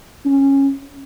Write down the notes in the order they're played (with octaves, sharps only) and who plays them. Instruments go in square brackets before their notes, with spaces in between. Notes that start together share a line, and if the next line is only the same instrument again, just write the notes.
[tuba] C#4